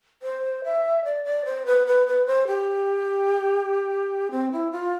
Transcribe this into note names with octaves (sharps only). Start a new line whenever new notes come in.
C5
E5
D5
D5
C5
B4
B4
B4
C5
G4
C4
E4
F4